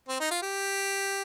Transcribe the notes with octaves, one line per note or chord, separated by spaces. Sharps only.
C4
D#4
F4
G4